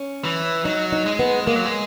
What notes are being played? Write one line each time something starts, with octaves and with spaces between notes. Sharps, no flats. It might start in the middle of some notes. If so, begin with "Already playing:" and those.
Already playing: C#4
E3
F#3 D#4
D#4
G#3
B3
G#3 A#3
F#3
G#3